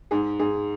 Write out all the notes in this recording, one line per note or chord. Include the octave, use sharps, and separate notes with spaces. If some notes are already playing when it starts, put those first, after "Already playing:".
G#2 G#4
G#2 G#4